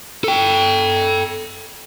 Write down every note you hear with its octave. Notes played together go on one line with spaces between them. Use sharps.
A4 G5